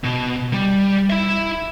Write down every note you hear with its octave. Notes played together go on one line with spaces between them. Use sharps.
B2
G3
E4 E5